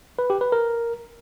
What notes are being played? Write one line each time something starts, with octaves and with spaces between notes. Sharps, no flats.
B4
G4
B4
A#4